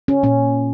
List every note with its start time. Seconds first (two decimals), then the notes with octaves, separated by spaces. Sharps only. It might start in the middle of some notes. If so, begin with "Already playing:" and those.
0.08 C#4
0.23 A#2 C#4